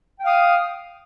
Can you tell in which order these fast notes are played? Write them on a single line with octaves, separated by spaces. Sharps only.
G5 F5 D#6